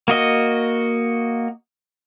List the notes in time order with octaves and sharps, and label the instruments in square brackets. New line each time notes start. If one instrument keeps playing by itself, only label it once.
[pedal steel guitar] A#3 F#4 D#5